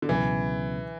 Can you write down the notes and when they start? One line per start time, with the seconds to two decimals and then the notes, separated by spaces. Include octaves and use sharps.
0.02 D3
0.09 C#2 B2 E3 F#3